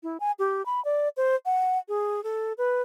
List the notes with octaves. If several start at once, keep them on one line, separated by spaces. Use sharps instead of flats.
E4
G#5
G4
B5
D5
C5
F#5
G#4
A4
B4